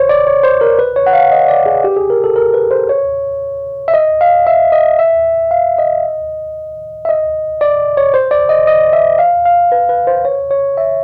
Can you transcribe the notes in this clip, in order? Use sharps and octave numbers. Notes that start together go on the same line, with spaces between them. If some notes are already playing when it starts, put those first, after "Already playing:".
Already playing: C5 C#5
D5
C#5
C5
A#4
B4
C#5
F#5
F5
D#5
D5
G#4
G4
G#4
A#4
A4
A#4
B4
C5
C#5
E5
D#5
F5
E5
D#5
E5
F5
D#5
E5
D#5
D5
C#5
C5
D5
D#5
D#5
E5
F5
F5
B4
B4
C5
C#5
C#5
E5